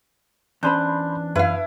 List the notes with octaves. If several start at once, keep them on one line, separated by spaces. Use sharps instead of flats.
E2 C#4 D4 C5 B5 C6 G6
F#2 E4 B4 F5